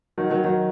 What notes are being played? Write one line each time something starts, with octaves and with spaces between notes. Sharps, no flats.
D#3 F#3
D#3 F#3
D#3 F#3